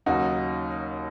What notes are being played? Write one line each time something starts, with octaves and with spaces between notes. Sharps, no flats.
D#2 C#3 F#3 D#4 F#4